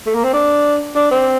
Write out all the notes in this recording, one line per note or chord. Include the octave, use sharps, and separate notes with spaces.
A3
A#3
C4
D4
D4
C4